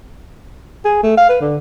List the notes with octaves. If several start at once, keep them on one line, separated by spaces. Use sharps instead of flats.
G#4
A3
F5
B4
D3